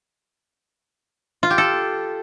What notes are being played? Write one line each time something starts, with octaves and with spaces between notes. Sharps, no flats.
F4
G4
A4